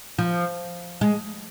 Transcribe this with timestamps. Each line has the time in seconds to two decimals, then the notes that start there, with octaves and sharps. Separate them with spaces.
0.18 F3
1.01 G#3